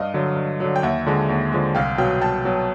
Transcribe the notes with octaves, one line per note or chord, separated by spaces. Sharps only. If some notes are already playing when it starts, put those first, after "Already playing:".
Already playing: G2 D#5 F5
D3 F#3
G2
D3 F#3
G5
D#2 E5 F#5
D3 F3 G#3
D#2
D3 F3 G#3
C2 F5 G5
B2 F#3 F5 G5
C2 G5 A5
B2 F#3